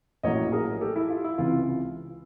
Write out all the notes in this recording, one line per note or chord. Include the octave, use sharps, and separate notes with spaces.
A#1 A2 F#3 A#3 C#4 C#5 D#5
G#4 A#4
G4 A4
E4
F4
E4
C#2 C3 E3 F4